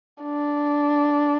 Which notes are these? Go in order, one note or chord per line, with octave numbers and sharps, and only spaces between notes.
D4